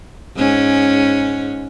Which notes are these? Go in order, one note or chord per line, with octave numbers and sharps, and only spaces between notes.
G#2 C#4